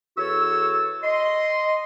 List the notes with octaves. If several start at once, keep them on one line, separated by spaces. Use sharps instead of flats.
E2 F#4 A4 C#5 E6
D#5 C6